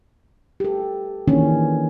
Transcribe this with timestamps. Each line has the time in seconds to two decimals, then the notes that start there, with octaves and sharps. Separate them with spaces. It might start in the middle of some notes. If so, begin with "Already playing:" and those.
0.60 G4 A4
1.28 D#3 E3 A#3 C#4 D4